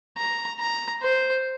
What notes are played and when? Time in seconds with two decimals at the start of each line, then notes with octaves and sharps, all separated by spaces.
0.17 A#5
0.59 A#5
1.01 C5